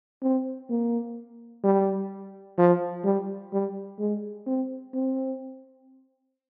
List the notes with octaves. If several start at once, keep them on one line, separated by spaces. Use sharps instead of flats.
C4
A#3
G3
F3
G3
G3
G#3
C4
C4